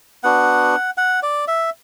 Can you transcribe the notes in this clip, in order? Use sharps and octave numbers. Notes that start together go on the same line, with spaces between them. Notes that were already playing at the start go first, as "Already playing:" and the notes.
B3 D4 F#4 F#5
F#5
D5
E5